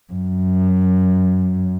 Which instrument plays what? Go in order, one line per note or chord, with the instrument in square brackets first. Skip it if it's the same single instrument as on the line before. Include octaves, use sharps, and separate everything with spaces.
[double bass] F#2